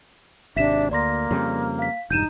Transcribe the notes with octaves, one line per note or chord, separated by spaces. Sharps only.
G#1 C3 D4 E5 B6 E7
D2 A#3 D5 C6 A#6
F2 C#3 G3
F5 B6
E1 G2 D#4 G6 D#7 E7